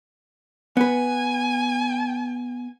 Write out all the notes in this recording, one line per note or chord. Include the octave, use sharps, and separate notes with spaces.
B3 B4 G#5